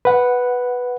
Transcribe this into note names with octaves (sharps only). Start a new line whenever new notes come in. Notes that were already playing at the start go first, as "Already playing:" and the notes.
B4 F#5